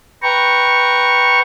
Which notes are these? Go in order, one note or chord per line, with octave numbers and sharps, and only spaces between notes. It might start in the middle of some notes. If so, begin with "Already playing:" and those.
B4 G5 A#5 C#6